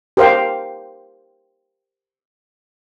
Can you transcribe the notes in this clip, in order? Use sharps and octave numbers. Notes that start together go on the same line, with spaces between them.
G4 A#4 C5 F5 G5